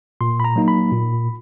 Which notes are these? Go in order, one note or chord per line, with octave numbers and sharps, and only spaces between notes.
A#2 C6
B5
A#5
F#3 A#3 D#4
B5
A#2